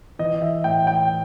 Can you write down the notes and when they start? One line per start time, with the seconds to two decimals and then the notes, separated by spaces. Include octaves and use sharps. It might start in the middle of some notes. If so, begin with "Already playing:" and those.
0.19 E3 D#5
0.42 E5
0.64 A2 G5
0.87 G5